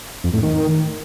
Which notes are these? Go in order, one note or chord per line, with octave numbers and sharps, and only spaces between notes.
F2
A2
D#3